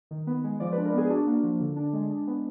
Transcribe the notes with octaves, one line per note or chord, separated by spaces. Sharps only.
D#3
B3
G#3
F3 D5
B4
D4
A#4
B3 G#4
D4 F#4
A#3
F3
D3
D4
G#3
D4
B3